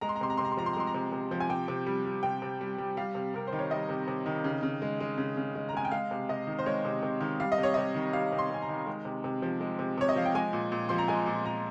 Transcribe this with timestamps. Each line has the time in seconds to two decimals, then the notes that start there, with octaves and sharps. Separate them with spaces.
0.01 G#3 A#5
0.09 C6
0.16 A#5
0.21 C3 C6
0.30 A#5
0.37 C3 C6
0.45 A#5
0.52 C6
0.57 F3 A#5
0.66 C6
0.73 A#5
0.76 G#3 C6
0.87 A#5
0.94 C3
1.12 C3
1.31 F3
1.40 G#5
1.50 C3 G5
1.68 C3
1.86 G3
2.05 G3
2.23 C3 G5
2.42 C3
2.61 G3
2.78 G3
2.97 G3 F5
3.15 C3
3.34 C3 A#4
3.47 C5
3.53 D#3
3.59 C#5
3.71 G3 D#5
3.89 C3
4.08 C3
4.26 D#3
4.44 C#3
4.63 C#3
4.82 G#3
5.00 G#3
5.18 C#3
5.37 C#3
5.55 G#3
5.69 A#5
5.74 G#3 G#5
5.85 G5
5.91 G#3 F5
6.11 C3
6.29 C3 D#5
6.47 D#3
6.59 C5
6.66 G#3 C#5
6.85 C3
7.03 C3
7.21 D#3
7.40 G3 F5
7.52 D#5
7.58 C3
7.63 C#5
7.74 C3 D#5
7.95 D#3
8.13 G3 F5
8.32 C3
8.38 C6
8.50 C3 G#5
8.62 A#5
8.69 D#3
8.86 G#3
9.05 C3
9.24 C3
9.42 F3
9.60 G#3
9.79 C3
9.98 C3 C#5
10.09 D#5
10.16 F3 F5
10.26 G5
10.35 G#3 G#5
10.53 A#2
10.72 A#2
10.89 F3 C6
10.98 A#5
11.08 G#3 G#5
11.26 A#2
11.45 A#2 A#5